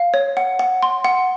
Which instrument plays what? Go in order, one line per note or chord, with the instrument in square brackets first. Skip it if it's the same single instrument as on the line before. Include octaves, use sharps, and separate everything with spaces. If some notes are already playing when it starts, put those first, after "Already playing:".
Already playing: [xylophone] F5
C#5
F#5
F#5
C6
F#5